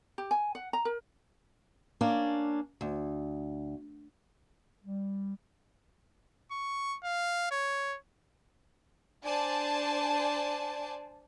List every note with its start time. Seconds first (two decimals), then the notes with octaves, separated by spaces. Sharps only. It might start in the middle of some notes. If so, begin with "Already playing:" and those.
0.18 G4
0.31 G#5
0.55 F#5
0.73 A#5
0.85 A#4
2.01 A#3 C#4 D4
2.81 D2
4.84 G3
6.52 C#6
7.04 F5
7.51 C#5
9.25 D4 C5 D5 G#5 A5